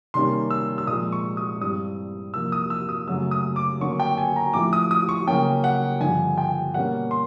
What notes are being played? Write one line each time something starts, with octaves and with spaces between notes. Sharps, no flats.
C3 D#3 G3 A#3 C#4 C6
E6
E6
A#2 F3 G#3 D#6
C#6
D#6
G2 E3 G3 C4 D#6
E2 C3 F3 A#3 E6
D#6
E6
D#6
F#2 C#3 F#3 A3 C#4 E6
D#6
D6
D3 F#3 A#3 C#4 C#6
G5
G#5
A#5
A2 F3 A3 D6
D#6
D#6
C#6
C#3 F#3 A#3 C#4 G5
F#5
G2 D3 F3 G#5
G5
B2 G3 A#3 C#4 F#5
C6